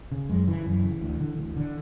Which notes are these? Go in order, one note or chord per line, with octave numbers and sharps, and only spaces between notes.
C#3
F#2 G#3
C#3 E3
F#2 E3
C#3
D2
D3
D2
D3